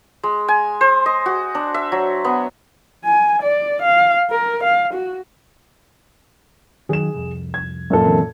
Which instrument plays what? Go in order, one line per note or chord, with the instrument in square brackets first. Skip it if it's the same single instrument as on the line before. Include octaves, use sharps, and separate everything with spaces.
[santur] G#3
G#5
C5
D#5
F#4
D4
E5
F#3
B3
[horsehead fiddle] G#5
D5
F5
A#4
F5
F#4
[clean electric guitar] D#3 F#3 [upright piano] G#4 E7
[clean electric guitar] C2 F2
[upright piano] G#6
F#2 A#2 A4
[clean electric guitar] D3 E3 C4